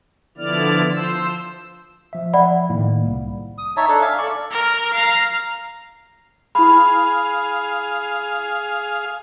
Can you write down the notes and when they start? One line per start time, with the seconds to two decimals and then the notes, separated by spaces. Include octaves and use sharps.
0.38 D3 F3 B3 E4 D5 F6
0.91 F3 C5 E6
2.13 F3 E5
2.33 D5 F#5 B5
2.69 A2 D#3 A#3
3.06 C2
3.58 D#6
3.77 D#4 C#5 E5 A5
3.89 D4 A4
4.02 E5 F5 G#5
4.18 A4 D5 C#6
4.51 A#4
4.93 F5 A#5
6.55 E4 G#4 F5 B5